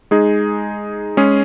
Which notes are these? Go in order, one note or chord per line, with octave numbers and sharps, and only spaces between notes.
G#3 D#4 G#4
G#3 C#4 G#4